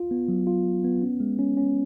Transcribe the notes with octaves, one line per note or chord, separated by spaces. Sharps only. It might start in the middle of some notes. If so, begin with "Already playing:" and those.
Already playing: F4
B3
F#3
F4
F#3
B3
C#4
G#3
C#4
C#4